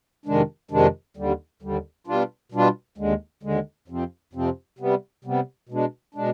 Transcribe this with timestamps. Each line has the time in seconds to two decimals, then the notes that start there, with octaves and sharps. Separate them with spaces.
0.26 F2 C3 D#3 G#3 D4
0.71 F2 C3 D#3 G#3 D4
1.17 D#2 D3 G3
1.62 D#2 D3 G3
2.07 B2 G3 D4 F4
2.52 B2 G3 D4 F4
2.98 D#2 D3 G#3
3.43 D#2 D3 G#3
3.88 F2 C3 F3 C4
4.33 F2 C3 F3 C4
4.79 C3 G3 B3
5.24 C3 G3 B3
5.69 B2 G#3 D4
6.15 B2 G#3 D4